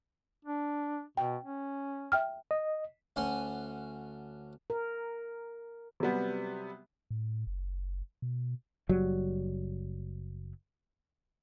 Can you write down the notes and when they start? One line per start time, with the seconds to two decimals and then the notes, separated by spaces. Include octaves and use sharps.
0.45 D4
1.17 B2 G5
1.44 C#4
2.12 E5 G5 F6
2.51 D#5
3.16 D2 C#4 F#5 G#5 C6
4.70 A#4
6.00 C3 F#3 G3 B3
7.11 A2
7.47 F#1
8.22 B2
8.89 F#1 F#3 G3